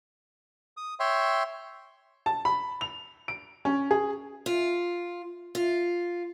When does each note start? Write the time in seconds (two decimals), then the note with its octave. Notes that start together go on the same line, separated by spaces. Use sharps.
0.77 D#6
1.00 C#5 E5 G5 C6
2.26 A5
2.45 B5
2.81 F7
3.28 D7
3.65 C#4
3.91 G#4
4.46 F4
5.55 F4